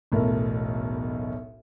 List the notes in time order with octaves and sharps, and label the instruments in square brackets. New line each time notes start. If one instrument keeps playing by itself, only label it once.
[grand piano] E1 B1 A2 A4 A#4